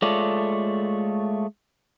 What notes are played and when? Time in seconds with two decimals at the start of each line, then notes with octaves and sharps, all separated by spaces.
0.02 G#3 A3 F4 A4 C#5 D5